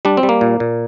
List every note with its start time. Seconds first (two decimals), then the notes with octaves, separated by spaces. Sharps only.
0.05 G3 D4
0.17 C4
0.23 G3
0.29 A#3
0.41 A#2
0.60 A#2